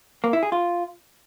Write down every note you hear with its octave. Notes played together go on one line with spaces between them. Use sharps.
A#3
E4
G#4
F4